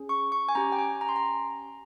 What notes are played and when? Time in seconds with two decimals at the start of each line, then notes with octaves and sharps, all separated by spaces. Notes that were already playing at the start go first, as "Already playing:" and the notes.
Already playing: C#4 G#4
0.09 C#6
0.32 C#6
0.49 G#5
0.55 C#4 G4 A#5
0.72 G5
0.79 G#5
1.01 A#5
1.09 C6
1.16 A#5